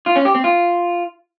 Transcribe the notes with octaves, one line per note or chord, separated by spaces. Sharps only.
F4
C#4
G4
C4
F4